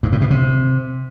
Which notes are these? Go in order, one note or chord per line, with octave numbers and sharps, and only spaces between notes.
G2
A2
B2
C3